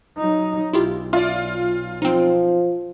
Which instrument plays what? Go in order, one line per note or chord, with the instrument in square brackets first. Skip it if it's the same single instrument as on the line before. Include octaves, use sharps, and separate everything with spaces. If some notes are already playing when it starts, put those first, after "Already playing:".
[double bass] F#3 D#4
[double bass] B1 [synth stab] E4 F4 G4
[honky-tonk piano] F4 [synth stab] D5 E5
[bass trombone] F3 [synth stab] C4 D#4